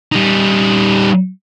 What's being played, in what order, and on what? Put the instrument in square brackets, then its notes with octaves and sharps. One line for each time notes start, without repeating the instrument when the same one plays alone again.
[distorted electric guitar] G3 D#4